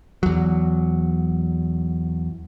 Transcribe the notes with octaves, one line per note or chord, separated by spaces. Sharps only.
E2 F#3